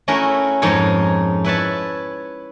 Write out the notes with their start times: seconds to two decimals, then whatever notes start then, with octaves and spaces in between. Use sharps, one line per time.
0.08 A3 C#4 E4 F#4 A#4
0.62 F2 G#2 D#4 A#4 C#5
1.44 E4 B4 C#5 A5